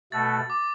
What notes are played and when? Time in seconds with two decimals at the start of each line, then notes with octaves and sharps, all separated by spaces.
0.12 B2 A3 F#4 A4 A6
0.50 D6